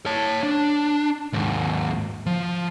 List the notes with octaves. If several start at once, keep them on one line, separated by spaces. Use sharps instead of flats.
C#5 A5
D4
D#2 G#2
F3